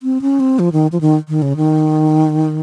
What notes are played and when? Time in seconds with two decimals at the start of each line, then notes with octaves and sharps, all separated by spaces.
0.03 C4
0.21 C#4
0.40 C4
0.59 F3
0.72 D#3
0.92 F3
1.01 D#3
1.28 D#3
1.42 C#3
1.57 D#3